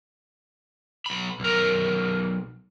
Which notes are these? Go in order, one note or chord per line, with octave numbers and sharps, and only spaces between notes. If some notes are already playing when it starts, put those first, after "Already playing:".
B1 B5
B1 A#4